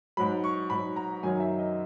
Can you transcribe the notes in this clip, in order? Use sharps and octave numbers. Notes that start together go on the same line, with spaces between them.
G#2 F#3 B5
C#6
G#2 F#3 B5
A#5
F#2 D#3 F#3 G#5
E5
D#5